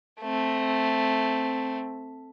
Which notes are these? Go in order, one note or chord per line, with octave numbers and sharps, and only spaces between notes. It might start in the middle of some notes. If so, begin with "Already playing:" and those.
A3 C4